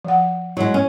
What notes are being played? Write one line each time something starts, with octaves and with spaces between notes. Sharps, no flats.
F3 F#5
F#3 G#3 E4
C#4